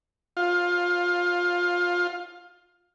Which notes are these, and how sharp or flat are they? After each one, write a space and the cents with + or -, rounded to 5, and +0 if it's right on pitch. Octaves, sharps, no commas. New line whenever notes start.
F4 +15